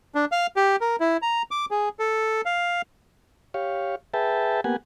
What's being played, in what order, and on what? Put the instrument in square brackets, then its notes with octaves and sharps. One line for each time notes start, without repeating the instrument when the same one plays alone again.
[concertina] D4
F5
G4
A#4
E4
A#5
D6
G#4
A4
F5
[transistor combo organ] G4 C#5 F5
G#4 B4 E5 G5 A5
A#3 B3 G4 F#5 G#5